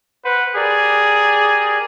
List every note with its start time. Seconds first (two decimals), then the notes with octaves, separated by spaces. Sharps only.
0.25 B4 C5 F#5
0.56 G4 G#4 A#4 D5